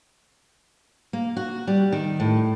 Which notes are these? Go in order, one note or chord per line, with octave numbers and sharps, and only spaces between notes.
A#3
F#4
G3
D#3
A2